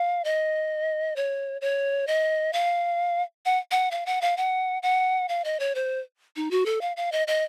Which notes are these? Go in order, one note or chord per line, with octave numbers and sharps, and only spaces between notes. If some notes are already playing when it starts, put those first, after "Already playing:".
Already playing: F5
D#5
C#5
C#5
D#5
F5
F#5
F#5
F5
F#5
F5
F#5
F#5
F5
D#5
C#5
C5
D#4
F#4
A4
F5
F5
D#5
D#5